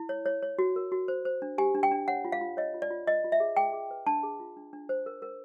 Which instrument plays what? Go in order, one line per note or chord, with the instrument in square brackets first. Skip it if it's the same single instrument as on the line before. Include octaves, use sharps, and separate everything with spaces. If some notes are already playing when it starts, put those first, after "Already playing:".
Already playing: [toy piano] E4
C#5
C#5
C#5
F#4
A#4
F#4
C5
C5
D4
G4 G#5
D4
G5
D4
C#5 F#5
F4
F5
F4
C#5 D#5
F4
D5
F4
F4 D#5
F4
E5
G#4
G#4 G5
G#4
B4
D4 A5
G#4
F4
D4
D4
C5
A#4
A#4